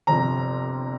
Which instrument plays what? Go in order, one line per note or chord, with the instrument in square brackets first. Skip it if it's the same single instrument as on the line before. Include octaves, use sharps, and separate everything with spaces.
[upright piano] G1 F2 C3 A#5